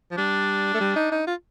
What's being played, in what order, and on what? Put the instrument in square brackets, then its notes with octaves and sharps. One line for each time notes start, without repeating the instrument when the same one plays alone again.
[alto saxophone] F3
[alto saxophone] G3 [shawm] D4
[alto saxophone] A3
G3
D#4
D#4
F4